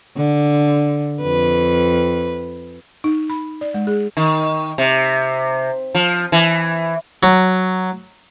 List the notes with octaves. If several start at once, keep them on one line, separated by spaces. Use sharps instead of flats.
D3
F2 B4
D#4
B5
D5
G#3
G#4
D#3
C3
F3
E3
F#3